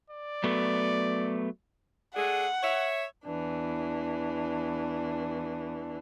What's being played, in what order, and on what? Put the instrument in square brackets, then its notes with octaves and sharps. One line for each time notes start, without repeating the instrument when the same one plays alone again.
[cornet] D5
[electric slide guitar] F#3 A3 B3
[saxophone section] A3 D4 G#4 [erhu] F#5
[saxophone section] C#5 E5
[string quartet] E2 E3 D4